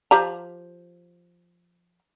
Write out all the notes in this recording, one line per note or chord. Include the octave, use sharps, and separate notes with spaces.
F3 G4 A#5